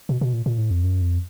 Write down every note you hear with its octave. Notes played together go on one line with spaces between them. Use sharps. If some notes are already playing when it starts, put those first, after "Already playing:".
B2
B2
A#2
A#2
A2
F2
F#2
F2